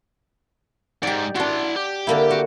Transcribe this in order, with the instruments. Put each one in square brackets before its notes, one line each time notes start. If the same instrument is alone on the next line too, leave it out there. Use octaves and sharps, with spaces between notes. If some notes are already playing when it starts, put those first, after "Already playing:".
[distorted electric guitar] G#2 [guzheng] G4 D5
[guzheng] D4 F#4 [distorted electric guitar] E4 C6
[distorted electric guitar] G4
[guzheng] D3 A#3 E4
F#4